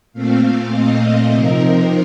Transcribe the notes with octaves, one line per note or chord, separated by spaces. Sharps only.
A#2 A3 C4 F5
D#5
C3 F3 C4 D#4 A#4